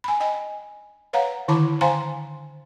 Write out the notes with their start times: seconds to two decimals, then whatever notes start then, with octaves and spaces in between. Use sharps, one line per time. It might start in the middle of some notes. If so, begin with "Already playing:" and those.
0.04 G#5 B5
0.20 D#5 G5 G#5
1.13 B4 C#5 F5 F#5 A#5
1.48 D3 D#3 E4 A5 B5 D6
1.81 C5 F5 G5 G#5 A#5 C6